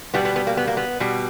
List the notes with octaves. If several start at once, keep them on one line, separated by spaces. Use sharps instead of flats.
B2 G3 B3
B3
B3
A#3
B3
A#3
B3
B2 G3